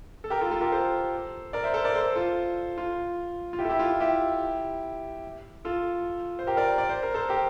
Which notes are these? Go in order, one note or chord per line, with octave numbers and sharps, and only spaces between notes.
A4
G4 A#4
F4 A4
F4 A4
G4 A#4
A4 C5
A#4 D5
C5 E5
A4 C5
A#4 D5
A4 C5
F4 A4
F4
F4
E4 G4
A4
E4 G4
F4
F4
E4 G4
F4 A4
C5
G4 A#4
A#4 D5
D5
C5
A#4
A4 C5
G4 A#4